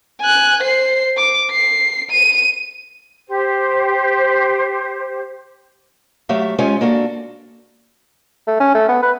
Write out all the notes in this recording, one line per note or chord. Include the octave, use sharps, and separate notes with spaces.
G#5 F#6
C5 C7
D6
C7
D#7
G4 C5
F#3 A3 G4 E5 F5
G#3 C#4 F4 G4 C#5 G#5
A#3 D4 F#4 A4
A3
C#4
A3
B3
B4